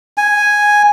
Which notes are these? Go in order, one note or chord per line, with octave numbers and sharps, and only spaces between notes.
G#5